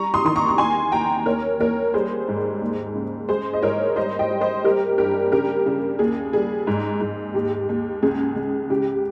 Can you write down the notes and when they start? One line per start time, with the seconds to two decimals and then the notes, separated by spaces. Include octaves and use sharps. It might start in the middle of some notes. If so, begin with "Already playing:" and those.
Already playing: G3 A#5 C#6
0.14 C6 D#6
0.25 D#3 C6
0.36 A#5 C#6
0.48 C#6
0.58 D#2 G#5 C6
0.92 D#2 G5 A#5
1.26 D#2 A#4 C#5
1.60 D#2 A#4 C#5
1.94 G3 G#4 C5
2.28 G#2
2.61 D#2
2.95 C#3
3.29 G#3 G#4 C5
3.53 D#5
3.62 G#2 A#4 C#5
3.96 G3 C5 D#5
4.19 D#5 G5
4.30 G3
4.41 C5 D#5
4.64 G3 G4 A#4
4.98 G2 G4 A#4
5.32 C#3 G4 A#4
5.66 C#3
5.99 D#2 G#4
6.33 G3 G#4
6.67 G#2
7.01 G#2
7.34 D#2 G4
7.69 D#2
8.03 C#2 G#4
8.36 C#2
8.70 C#3 G4